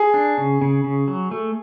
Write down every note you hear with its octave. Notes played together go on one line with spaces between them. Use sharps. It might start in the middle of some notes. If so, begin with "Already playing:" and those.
Already playing: G#4
D4
C#3
C#3
C#3
F#3
A3